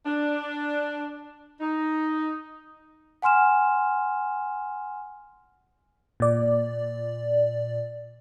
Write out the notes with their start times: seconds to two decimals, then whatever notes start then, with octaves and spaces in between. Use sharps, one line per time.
0.06 D4
1.61 D#4
3.22 F#5 G#5 C6 F6 E7
6.20 A#2 D5